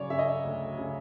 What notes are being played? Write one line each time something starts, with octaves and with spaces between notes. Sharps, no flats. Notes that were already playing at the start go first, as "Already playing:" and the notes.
Already playing: C#3 F#3 C#5 D5
C#3 E5
D#5
E5
D2
C#3